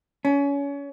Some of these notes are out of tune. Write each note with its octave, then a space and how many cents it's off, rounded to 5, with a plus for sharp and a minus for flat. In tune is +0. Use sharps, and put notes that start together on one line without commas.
C#4 +30